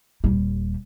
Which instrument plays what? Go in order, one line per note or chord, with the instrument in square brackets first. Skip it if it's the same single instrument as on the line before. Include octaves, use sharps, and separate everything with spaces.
[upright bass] D#1 G3